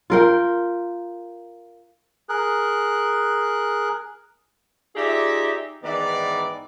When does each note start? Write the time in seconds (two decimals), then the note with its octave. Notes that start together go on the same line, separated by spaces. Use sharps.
0.10 F4 A#4 G5
2.29 G#4 A#4 F#6
4.96 D#4 F4 G4 G#4 D5 E5
5.83 G#2 D#3 E3 B3 D5